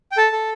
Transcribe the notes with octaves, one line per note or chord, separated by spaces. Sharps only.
G5
A4 A5
A4